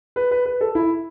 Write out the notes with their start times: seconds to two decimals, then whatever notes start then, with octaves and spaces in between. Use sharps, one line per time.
0.16 B4
0.31 B4
0.45 B4
0.61 A4
0.75 E4